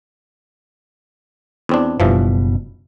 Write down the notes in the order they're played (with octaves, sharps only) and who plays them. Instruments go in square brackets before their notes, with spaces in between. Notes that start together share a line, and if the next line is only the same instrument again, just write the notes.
[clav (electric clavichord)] E2 C4 D4
[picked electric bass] F#1 B2 [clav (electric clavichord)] G2 E3 F3